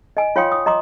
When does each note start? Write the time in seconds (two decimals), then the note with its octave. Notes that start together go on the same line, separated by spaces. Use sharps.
0.17 D#5 G#5
0.36 F4 C#5 F5 G5 C6 D#6
0.52 D#6
0.66 D#5 A#5 C6 D6 D#6